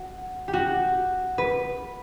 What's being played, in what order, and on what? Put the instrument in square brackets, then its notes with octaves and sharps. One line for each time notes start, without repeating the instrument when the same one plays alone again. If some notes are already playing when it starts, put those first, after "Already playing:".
Already playing: [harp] F#4
G4
F#4
B4